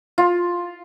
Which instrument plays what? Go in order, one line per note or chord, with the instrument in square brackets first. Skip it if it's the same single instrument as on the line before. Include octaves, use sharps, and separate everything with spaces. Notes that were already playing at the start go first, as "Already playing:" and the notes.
[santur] F4